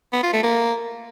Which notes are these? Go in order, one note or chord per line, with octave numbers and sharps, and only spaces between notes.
B3
F4
A3
A#3